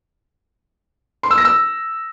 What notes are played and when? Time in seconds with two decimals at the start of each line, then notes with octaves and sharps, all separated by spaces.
1.23 C6
1.31 E6
1.38 A#6
1.45 E6